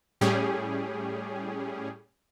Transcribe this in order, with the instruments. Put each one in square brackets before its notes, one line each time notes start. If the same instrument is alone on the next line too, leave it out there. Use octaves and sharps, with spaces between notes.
[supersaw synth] A2 G3 C#4 G4 G#4